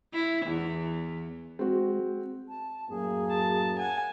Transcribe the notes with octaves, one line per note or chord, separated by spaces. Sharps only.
E4
E2
G#3 C4 F#4
A5
F#2 A2 A#3 G#4
A5
F#5 G#5